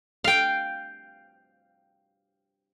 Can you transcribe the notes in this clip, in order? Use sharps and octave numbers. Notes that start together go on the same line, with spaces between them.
F5 G5